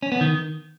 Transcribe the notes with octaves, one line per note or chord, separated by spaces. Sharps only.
C#4
B3
D#3